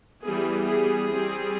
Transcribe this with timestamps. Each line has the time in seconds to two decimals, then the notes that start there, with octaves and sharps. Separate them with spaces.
0.23 E3 G3 B3 G#4
0.66 G#4
1.09 G3 C4